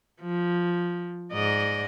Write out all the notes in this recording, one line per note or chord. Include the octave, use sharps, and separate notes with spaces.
F3
G#2 D5 D#5